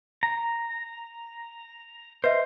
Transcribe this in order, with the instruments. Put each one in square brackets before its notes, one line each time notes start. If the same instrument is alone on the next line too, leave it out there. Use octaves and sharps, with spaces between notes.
[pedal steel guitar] A#5
[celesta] B4 D#5 E5 [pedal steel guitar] C5